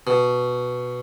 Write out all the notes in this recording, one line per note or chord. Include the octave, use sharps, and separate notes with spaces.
B2